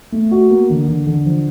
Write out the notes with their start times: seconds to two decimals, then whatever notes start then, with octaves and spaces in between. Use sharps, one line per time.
0.12 A3
0.31 F#4
0.50 A#3
0.70 D3
0.88 D3
1.07 D3
1.26 F3